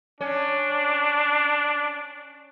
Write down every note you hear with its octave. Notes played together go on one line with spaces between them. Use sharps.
C#4 D4